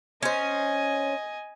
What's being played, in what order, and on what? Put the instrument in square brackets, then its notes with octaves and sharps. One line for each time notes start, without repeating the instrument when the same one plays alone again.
[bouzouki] C#4 C5 [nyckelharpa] D#5 G#5